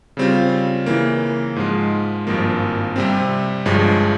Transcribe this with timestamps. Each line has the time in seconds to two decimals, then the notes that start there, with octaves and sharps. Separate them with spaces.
0.17 C#3 G3 C4 F4
0.86 C#3 E3 A#3
1.56 G#2 F3 G#3
2.27 G#1 G2 F3 A#3
2.96 C3 G3 C4
3.65 G1 G2 F3 G#3